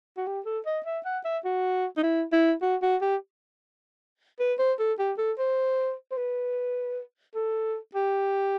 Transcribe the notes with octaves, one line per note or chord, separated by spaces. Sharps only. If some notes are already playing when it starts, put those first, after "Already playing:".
F#4
G4
A4
D#5
E5
F#5
E5
F#4
D#4
E4
E4
F#4
F#4
G4
B4
C5
A4
G4
A4
C5
C5
B4
A4
G4